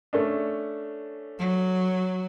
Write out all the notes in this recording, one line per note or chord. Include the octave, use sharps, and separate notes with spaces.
A3 C#4 D4
F#3